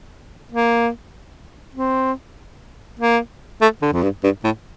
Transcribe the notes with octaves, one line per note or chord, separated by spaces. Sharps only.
A#3
C4
A#3
A3
D3
F2
G2
G2
A2